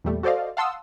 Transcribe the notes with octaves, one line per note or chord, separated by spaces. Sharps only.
E2 A#2 G3 A3
F#4 A4 C5 D5 D#5 F5
F5 F#5 A5 C6 D#6 E6